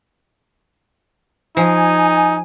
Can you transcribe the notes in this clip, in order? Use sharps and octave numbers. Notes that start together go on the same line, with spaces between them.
F3 D#4 G#5